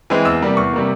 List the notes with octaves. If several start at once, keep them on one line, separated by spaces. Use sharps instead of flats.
E3 G#3 C4
E2 E6
C3 G3 A#3
E2 C#6
C3 G3 A#3